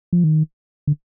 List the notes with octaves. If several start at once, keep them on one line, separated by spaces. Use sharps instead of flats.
F3
D#3
D3